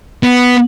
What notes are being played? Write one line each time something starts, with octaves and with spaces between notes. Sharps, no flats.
B3